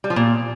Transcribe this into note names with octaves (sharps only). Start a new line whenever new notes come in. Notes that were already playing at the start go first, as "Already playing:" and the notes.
G3
F3
A#2